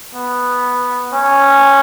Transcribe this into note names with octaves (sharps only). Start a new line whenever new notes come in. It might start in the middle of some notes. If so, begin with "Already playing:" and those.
B3
C#4